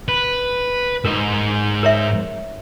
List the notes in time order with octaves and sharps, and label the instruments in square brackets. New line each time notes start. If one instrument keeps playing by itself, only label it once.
[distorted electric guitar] B4
[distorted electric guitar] G#2 D#5 [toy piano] A#4
[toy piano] A#4 C#5 E5